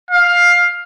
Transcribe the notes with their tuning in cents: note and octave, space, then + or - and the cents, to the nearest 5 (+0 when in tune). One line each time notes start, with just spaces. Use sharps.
F5 +10